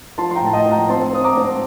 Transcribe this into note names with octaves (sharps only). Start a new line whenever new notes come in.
F3 A5 C6
C6
G5 A#5
A2 A5
D#5 G5
F3
G5 A#5
C4 A5 C6
C4 D#6
A#5 D6
C4